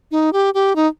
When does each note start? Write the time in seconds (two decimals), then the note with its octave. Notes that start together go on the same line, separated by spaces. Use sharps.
0.11 D#4
0.33 G4
0.54 G4
0.76 D#4